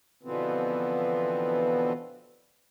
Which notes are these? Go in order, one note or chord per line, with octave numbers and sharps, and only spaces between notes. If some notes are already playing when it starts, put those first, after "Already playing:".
B2 D3 E3 F3 B3 C4